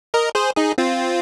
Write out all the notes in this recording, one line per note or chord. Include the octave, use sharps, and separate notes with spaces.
A#4 D#5
G#4 C5
D#4 G#4
C4 F4